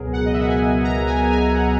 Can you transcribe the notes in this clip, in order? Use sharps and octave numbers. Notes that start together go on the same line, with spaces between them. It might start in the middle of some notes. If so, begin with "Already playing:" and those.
Already playing: C#2 B2 F#3 B3 G#4 A#4
F#5
D#5
E5
F#5
G#5
A#5
G#5
G#5
F#5